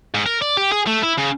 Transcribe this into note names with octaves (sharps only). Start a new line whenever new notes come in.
G#2
A#4
D5
G4
G#4
A3
E4
C#3